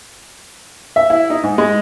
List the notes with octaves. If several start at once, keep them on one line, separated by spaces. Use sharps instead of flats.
E5
E4
D#4
G#2
G#3